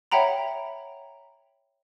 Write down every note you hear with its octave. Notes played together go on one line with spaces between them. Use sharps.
C#5 E5 F#5 G5 A#5 B5